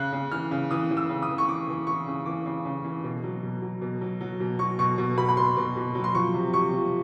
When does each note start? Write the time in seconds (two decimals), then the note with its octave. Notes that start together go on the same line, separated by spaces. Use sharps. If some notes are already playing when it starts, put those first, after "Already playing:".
Already playing: C#3 F#6
0.13 C#3
0.32 E3 F6
0.51 C#3
0.71 E3 D#6
0.91 E3
0.97 E6
1.09 C#3
1.22 D#6
1.30 E3
1.38 C#6
1.48 E3 D6
1.68 E3
1.87 E3 C#6
2.07 C#3
2.26 E3 D6
2.46 C#3
2.65 C#3
2.84 E3
3.04 B2
3.24 F#3
3.43 B2
3.62 F#3
3.82 B2
4.01 F#3
4.21 F#3
4.40 B2
4.59 F#3 C#6
4.79 B2 C#6
4.98 B2
5.17 B2 B5
5.29 B5
5.37 B2 C6
5.57 B2
5.76 B2
5.95 F#3
6.04 C6
6.15 F3 C#6
6.34 C3
6.54 C3 C#6
6.73 F3